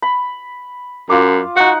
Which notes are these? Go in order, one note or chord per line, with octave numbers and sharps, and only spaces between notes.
B5
F#2 F4 D6
D#4 F#4 F#5